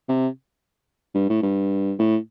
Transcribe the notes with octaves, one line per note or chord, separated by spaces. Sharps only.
C3
G2
A2
G2
A2